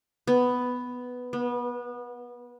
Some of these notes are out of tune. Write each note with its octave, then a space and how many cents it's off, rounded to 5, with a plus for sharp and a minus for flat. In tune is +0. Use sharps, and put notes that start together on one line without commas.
B3 +5
B3 -25